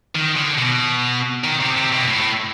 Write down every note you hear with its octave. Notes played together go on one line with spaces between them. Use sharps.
D#3
D3
B2
D#3
C3
C3
B2
A2